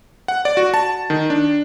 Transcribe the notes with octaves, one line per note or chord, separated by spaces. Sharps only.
F#5
D5
F#4
A5
D#3
D4